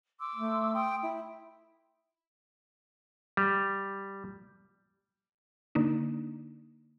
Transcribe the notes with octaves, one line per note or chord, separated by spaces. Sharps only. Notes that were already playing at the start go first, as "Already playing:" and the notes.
C6 D6 E6
A3
G5 C6 D#6
E4
G3
D3 A#3 D4 D#4